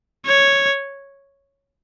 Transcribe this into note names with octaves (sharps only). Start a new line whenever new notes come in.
C#5